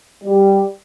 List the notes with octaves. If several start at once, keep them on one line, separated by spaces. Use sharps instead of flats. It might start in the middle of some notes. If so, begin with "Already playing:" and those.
G3